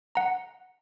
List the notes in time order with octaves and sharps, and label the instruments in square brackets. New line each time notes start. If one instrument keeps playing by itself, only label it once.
[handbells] F#5 A#5